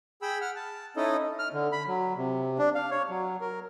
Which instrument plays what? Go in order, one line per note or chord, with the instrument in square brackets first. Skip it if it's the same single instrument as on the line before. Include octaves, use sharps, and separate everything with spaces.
[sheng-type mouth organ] G#4 G5 B5 E6
F#5 F6
A5
C#4 D#4 E4 A4 D#5
[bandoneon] F6
D3
B5
F#3
C3
D4
F5
C#5
F#3
A#4